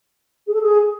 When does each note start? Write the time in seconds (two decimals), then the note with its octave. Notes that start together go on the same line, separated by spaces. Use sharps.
0.47 G#4
0.53 A4
0.61 G#4